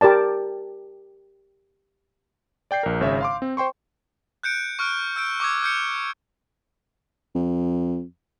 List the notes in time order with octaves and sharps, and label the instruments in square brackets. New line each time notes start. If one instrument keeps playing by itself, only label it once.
[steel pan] G4 A#4 D5 A5
[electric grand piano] D5 G5 G6 C7
A#1 A#4
G#1 C#3 C#5 E5
F5 C6 D6
C4
C5 G5 C6 C#6
[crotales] F#6 G6 C#7 D7
C#6 F6 F#6 D7
E6 G6 D7
C#6 D6 E6 G#6
F6 G6 C#7
[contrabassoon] F2